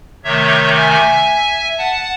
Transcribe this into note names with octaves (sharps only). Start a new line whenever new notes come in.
C3 D#3 A3 C#5 E5
E5 G#5
F#5 A5